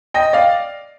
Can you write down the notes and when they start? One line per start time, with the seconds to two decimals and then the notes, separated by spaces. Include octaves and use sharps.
0.14 D#5 G5
0.33 D5 F5